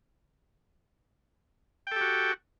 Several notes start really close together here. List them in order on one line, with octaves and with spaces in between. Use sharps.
G5 A4 G4 F#4